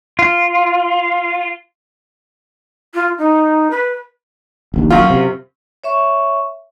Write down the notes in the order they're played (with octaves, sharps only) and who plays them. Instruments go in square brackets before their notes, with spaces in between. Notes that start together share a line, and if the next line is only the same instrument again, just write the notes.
[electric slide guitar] F4
[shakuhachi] F4
D#4
B4
[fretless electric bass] D#1 A#1 D#2
[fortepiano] F#2 F4
[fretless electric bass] C3
[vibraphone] C#5 E5 C#6